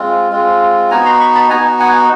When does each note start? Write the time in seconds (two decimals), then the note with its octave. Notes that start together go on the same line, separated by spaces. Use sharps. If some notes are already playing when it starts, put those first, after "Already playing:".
Already playing: G#3 C4 F4
0.31 G#3 C4 F4
0.91 B3 D#4 F#4 G#5 A#5
1.06 A#5 C6
1.20 B5 C#6
1.35 A5 B5
1.50 B3 D#4 F#4 G#5 A#5
1.79 F#5 G#5